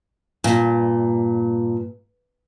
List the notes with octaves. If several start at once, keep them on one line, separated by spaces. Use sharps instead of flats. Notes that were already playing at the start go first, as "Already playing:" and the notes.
G2 A#2